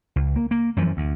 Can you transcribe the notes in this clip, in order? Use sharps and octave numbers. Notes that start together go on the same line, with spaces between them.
C#2
A#3
A#3
F#2 E3 F3
D2